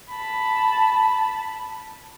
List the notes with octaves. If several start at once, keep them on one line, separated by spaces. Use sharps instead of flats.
A5 B5